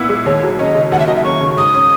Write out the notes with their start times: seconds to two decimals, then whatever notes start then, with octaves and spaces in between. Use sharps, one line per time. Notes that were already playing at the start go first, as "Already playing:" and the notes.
Already playing: A#2 B3 E4
0.09 G#3
0.26 D#2 C#5
0.43 F#3
0.59 C#4 D#5
0.75 C#3
0.92 D#2 F#5
0.99 E5
1.07 F#3 D#5
1.16 E5
1.24 C#4 C#6
1.40 C#3
1.57 G#2 D#6
1.74 C#4